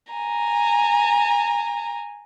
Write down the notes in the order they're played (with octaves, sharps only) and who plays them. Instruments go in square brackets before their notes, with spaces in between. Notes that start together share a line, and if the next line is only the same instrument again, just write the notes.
[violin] G#5 A#5